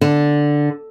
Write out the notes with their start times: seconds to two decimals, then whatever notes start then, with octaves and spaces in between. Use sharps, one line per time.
0.01 D3